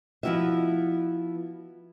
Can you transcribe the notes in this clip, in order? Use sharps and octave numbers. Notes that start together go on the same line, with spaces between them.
F3 B3 E4 F#4 D#5 E5